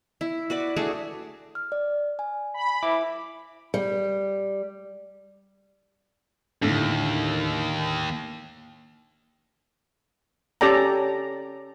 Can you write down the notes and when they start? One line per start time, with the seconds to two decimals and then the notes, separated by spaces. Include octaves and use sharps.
0.21 E4
0.50 F#4 B4 D5
0.76 A3 D4 F#4 G#4
1.55 F6
1.72 D5
2.19 G#5
2.54 B5
2.83 E4 D6
3.74 G3
6.62 D#2 A2 D3
10.61 C#4 G4 A4 D5 G5 A#5